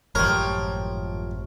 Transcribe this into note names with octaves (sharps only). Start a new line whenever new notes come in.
G#1 F#2 A2 F3 G4 A#4 C#5